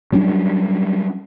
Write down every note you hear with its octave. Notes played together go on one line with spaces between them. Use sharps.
F#3 G3 C#4 D4